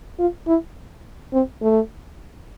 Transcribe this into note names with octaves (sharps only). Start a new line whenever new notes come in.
F4
E4
C4
A3